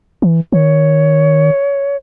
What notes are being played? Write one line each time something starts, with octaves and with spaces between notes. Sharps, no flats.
E3
D#3 C#5